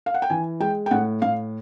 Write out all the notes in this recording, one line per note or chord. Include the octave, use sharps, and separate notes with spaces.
F5
F#5
G5
E3 G#5
G#3 G5
G5
A2 F#5
A2 F5